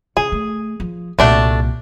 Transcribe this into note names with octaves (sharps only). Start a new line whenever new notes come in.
C#3 G#4
A3
F3
C2 A#2 A3 D4 F#4